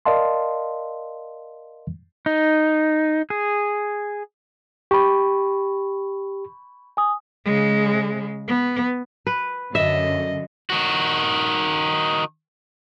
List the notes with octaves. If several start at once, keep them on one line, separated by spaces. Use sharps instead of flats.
A#4 D5 D#5 F5 A5 C6
D#4
G#4
G4 B5 C#6
G#5 D#6
C#3 G#3
B3
B4
F#2 D3 D#5 E5
D#3 F#4